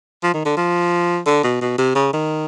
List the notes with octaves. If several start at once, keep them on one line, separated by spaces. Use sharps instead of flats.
F3
D#3
D3
F3
D3
B2
B2
C3
C#3
D#3